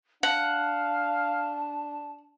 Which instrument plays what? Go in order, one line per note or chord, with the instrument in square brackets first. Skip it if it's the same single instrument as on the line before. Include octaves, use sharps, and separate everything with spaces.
[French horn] D4 [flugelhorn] F5 [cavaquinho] F#5 [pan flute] A5